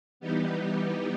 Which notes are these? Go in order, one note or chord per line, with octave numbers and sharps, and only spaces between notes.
E3 G3 B3 D#4 G4